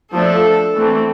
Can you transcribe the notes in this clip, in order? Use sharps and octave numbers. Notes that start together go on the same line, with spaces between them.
F3 A3 D4 A4
E3 A3 C4